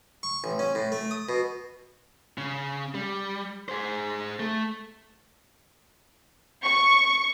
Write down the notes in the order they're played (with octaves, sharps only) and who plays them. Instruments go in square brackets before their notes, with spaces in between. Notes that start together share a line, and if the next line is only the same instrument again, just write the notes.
[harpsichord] C#6
A1
C#4
A2
A3
D#6
B2
[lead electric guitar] C#3
G3
G#4 C5
A3
[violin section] C#6